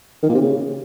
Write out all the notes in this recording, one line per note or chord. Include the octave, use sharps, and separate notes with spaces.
D#3
A#2
C3
C#3